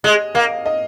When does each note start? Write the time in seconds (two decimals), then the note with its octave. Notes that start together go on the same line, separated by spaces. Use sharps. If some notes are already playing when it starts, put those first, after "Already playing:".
0.04 G#3 D#5
0.34 A#3 F5
0.66 D#5